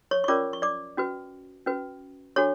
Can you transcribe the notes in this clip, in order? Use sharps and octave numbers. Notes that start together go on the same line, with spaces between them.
C#5 C#6
C#6
C#4 F4 A#4 C#5 D5 D6
C#6
D5 D6
C#4 F#4 B4
C#4 F#4 B4
D4 F#4 A4 C#5 C#6